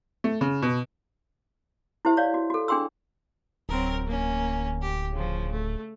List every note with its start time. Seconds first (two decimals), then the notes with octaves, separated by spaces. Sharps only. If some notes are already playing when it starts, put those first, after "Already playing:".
0.24 A3
0.41 C#3
0.62 B2
2.05 E4 G4 C5 E5
2.17 C#5 D5 F5
2.34 F#4
2.50 F#4 A4
2.68 D4 G#4 G5 C6 E6
3.69 D1 F#3 C4 A#4
4.05 A#3 C#4
4.80 G4
5.12 C#3 F3
5.52 A3